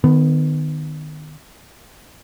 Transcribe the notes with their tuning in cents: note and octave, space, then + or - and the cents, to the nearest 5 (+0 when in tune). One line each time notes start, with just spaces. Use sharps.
D#3 -25 B3 +15